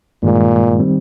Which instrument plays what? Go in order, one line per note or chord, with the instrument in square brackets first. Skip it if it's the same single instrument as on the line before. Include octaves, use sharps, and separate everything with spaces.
[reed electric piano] G2 D#3 G#3 [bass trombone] A#2
[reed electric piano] D#3 G3 C4